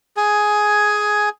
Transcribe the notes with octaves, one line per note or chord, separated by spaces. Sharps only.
G#4 G#5